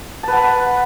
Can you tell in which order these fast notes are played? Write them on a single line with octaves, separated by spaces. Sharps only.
A5 B4 F#5 B5